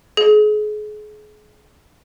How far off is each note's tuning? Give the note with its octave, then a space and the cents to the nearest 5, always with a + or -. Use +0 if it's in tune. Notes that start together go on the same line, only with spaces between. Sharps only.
G#4 +35